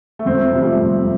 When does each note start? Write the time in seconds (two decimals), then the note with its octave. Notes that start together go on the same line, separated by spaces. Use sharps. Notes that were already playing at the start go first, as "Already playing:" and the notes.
0.19 A3
0.26 F2 C4
0.45 A3
0.53 C3 F3
0.62 G3
0.80 F2 A3